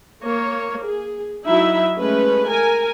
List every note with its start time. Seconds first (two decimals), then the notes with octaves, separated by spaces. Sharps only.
0.23 A#3 C#5
0.85 G#4
1.46 F#3 D#4 E4 E5
1.98 G#3 A3 C#4 B4
2.49 A#4 G#5